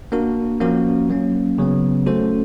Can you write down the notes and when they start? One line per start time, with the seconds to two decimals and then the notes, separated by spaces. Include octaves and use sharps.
0.12 A#3 D4 F#4 A#4
0.60 F3 A#3 C#4 F#4 A#4
1.10 F#3 A#3 C#4
1.58 C#3 F#3 B3
2.06 A3 C#4 F#4 A4 C5